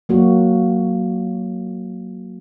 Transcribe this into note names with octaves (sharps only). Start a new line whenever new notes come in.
F#3 A#3 F#4